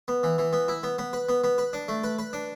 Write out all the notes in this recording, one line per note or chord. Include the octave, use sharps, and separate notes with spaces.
B3
E3
E3
B3
E4
B3
B3
B4
B3
B3
B4
D4
A3
B4
B4
D4